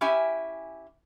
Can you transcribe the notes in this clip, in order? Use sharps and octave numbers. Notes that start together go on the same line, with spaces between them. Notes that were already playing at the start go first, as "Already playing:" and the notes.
C#4 E4 G4 E5 G#5